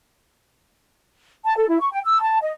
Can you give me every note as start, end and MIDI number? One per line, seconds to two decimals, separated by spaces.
1.45 1.57 81
1.57 1.67 69
1.68 1.79 64
1.80 1.89 85
1.92 2.00 79
2.05 2.21 88
2.22 2.38 81
2.41 2.51 75